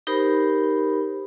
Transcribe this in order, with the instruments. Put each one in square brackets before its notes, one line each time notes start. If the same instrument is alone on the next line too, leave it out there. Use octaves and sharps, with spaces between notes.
[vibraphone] D#4 G4 A#4 C5 B5